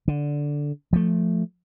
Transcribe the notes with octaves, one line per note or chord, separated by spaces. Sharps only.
D3
F3 A3